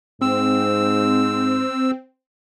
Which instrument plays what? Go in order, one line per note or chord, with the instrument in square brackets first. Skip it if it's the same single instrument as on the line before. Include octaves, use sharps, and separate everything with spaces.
[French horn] G#2 [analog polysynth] C4 [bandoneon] E6